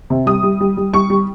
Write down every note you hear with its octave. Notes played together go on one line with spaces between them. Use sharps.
C3
G3 D#6
G3
G3
G3
G3 C#6
G3